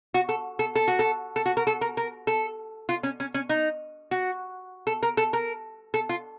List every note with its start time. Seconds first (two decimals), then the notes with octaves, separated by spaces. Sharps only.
0.14 F#4
0.29 A4
0.59 A4
0.75 A4
0.88 F#4
0.99 A4
1.36 A4
1.46 F#4
1.57 A#4
1.67 A4
1.81 A#4
1.97 A#4
2.27 A4
2.89 F4
3.03 C#4
3.20 C#4
3.34 C#4
3.49 D#4
4.11 F#4
4.87 A4
5.03 A#4
5.17 A4
5.33 A#4
5.94 A4
6.09 F4